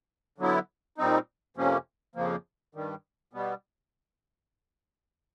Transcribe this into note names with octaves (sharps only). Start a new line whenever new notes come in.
D3 F#3 B3 E4
A#2 G3 C4 D#4
F2 C3 F3 A#3 C#4
F2 C#3 F3 A#3
G2 D#3 G3
B2 G3 B3